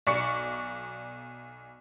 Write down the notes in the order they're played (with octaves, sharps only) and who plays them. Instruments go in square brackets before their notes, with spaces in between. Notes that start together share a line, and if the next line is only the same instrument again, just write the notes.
[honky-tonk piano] B1 D5 C#6 C#7